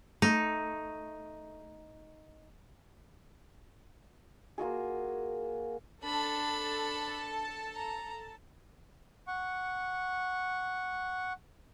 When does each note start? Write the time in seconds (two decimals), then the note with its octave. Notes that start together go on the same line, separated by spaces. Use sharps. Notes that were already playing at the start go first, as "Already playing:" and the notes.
0.22 A3 D#4
4.58 A#3 F4 F#4 G#4
6.04 D4 A4 A5 B5
7.76 A#5
9.27 F#5 C#6